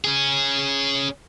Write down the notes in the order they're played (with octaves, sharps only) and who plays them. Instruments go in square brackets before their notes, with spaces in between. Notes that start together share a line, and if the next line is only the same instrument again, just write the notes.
[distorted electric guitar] C#4 G#4